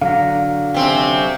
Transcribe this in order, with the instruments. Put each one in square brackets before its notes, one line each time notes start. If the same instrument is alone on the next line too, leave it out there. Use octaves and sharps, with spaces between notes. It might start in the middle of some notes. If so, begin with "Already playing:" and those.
[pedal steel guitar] D3 F#3 A#5 [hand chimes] F5
[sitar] C3 C4 [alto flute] C#4